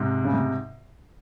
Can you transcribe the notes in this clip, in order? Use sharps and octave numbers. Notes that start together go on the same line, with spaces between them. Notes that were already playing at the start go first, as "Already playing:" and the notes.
Already playing: G#2 C3
C#3
G#2 C3